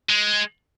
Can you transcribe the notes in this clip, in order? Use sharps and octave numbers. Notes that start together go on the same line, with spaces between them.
G#3